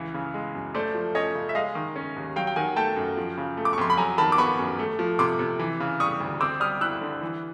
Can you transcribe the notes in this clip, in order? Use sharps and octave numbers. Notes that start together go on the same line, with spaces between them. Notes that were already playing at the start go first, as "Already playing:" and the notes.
Already playing: C#2 E3
C#3
G#3
F#2
A3 C5 D5
F3
C#4 C#5 D#5
C#3
E5
G#3 D#5 F5
D#3
C#4
D#2
F#3 F5 G5
G5
D#3 F#5 G#5
A3 G5 A5
F#2
F3
C#3
A3
D6
C#6
F2 C6
B5
F#3 G#5 A#5
D#3 A5 B5
D6
B3 B5 C#6
F#2
A3
F3
C3 C6 D6
C3
E3
C#3
G3 C#6 D#6
D2
C4 D6 E6
G3 D#6 F6
E4 E6 F#6
D3
E3